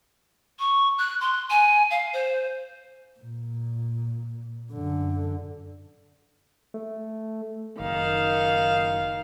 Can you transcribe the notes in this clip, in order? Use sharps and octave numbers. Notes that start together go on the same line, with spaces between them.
C#6
F#6
C6
G#5
F5
C5
A#2
F#2 D3
A3
F#1 D#3 F5